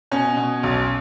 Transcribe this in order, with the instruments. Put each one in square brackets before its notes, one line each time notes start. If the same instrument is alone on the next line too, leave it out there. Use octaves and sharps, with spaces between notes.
[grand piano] B2 C#4
B2
B1